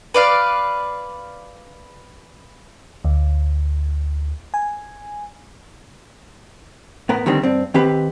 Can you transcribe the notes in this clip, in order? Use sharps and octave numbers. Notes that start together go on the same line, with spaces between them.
B4 D5 F5
D2
G#5
A2 B3 A#4
D3 D#3 G3 C4
G2 C4
D#3 C4 G4 B4 B5